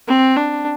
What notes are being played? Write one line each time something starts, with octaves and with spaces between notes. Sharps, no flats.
C4
D4